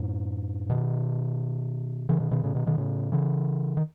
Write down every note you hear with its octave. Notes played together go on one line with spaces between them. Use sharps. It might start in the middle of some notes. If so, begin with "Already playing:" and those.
Already playing: F#2 A2
B2 D#3
C#3 E3
B2 D#3
B2 D#3
A2 C#3
B2 D#3
B2 D#3
A2 C#3
C#3 E3
D#3